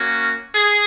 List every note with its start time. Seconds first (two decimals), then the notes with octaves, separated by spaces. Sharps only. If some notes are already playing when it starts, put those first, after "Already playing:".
Already playing: A#3 C#4 F#4
0.55 G#4